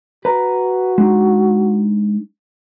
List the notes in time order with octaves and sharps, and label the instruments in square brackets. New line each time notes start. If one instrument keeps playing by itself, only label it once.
[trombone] F#4 [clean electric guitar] B4 A#5
[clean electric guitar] G#3 D4 D#4